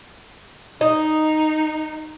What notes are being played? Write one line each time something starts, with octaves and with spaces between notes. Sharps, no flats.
D#4 D#5